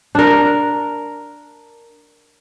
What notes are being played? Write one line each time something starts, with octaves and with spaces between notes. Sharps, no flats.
D4 A#4